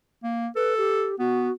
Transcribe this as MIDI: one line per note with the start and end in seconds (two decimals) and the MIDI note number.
0.23 0.47 58
0.56 1.10 69
0.56 0.74 71
0.78 1.18 67
1.19 1.50 59
1.19 1.52 66